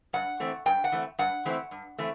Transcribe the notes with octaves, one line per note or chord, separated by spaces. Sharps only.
G2 F#5
E3 A3 C4
G2 G5
F#5
E3 A3 C4
G2 F#5
E3 A3 C4
G2
E3 A3 C4